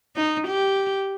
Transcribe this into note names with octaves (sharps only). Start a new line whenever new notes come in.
D#4
G4